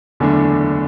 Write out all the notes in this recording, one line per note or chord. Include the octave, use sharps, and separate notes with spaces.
F#1 E2 D3 A3 D4